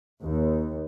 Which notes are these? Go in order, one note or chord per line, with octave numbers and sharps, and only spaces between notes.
D#2